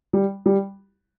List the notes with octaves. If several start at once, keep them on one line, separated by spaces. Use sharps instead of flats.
G3
G3